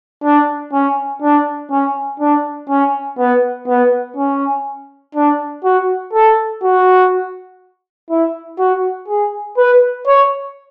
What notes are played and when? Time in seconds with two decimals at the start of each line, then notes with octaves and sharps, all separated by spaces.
0.23 D4
0.73 C#4
1.22 D4
1.71 C#4
2.20 D4
2.69 C#4
3.19 B3
3.68 B3
4.17 C#4
5.15 D4
5.64 F#4
6.13 A4
6.63 F#4
8.10 E4
8.59 F#4
9.09 G#4
9.57 B4
10.07 C#5